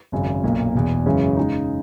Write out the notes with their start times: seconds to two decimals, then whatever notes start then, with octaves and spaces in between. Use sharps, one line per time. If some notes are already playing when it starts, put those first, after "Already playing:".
0.12 G#1 F#2 C#3
0.44 B1 A#2 A#3
0.75 E1 E2 B2
1.06 F#2 C#3 E3 G#3 C#4
1.37 C#3 G#3 D#4